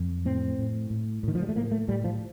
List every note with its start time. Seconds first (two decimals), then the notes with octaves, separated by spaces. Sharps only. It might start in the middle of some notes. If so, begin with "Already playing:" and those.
Already playing: F2
0.25 A2 C4
0.58 A2
0.90 A2
1.23 A2 D#3
1.35 F3
1.42 G3
1.49 A3
1.56 A2 A#3
1.72 A3
1.88 A2 G3
2.04 F3